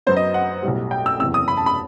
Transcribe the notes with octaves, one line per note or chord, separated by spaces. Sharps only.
F#2 F#3 B3 C5
D#5
F#5
B1 A2 G3
G5
E6
F#1 E2 C3 E6
D#6
B5
A5
B5